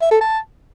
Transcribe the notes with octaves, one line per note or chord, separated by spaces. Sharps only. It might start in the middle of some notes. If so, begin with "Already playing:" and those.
E5
A4
A5